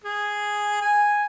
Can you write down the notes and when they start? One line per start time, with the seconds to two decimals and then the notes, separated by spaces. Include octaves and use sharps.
0.04 G#4
0.82 G#5